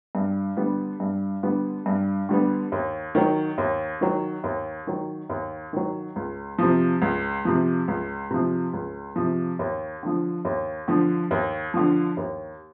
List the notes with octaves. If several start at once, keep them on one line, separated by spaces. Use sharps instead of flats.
G2
D3 G3 B3
G2
D3 G3 B3
G2
D3 G3 B3
D#2
D#3 F#3
D#2
D#3 F#3
D#2
D#3 F#3
D#2
D#3 F#3
C#2
C3 F3
C#2
C3 F3
C#2
C3 F3
C#2
C3 F3
D#2
D3 F3
D#2
D3 F3
D#2
D3 F3
D#2